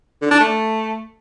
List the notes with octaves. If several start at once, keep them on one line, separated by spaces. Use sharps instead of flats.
D3
D4
A3